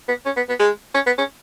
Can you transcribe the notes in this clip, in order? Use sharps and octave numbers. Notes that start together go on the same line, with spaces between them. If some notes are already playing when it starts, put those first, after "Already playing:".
B3
C#4
B3
B3
G#3
C#4
B3
C#4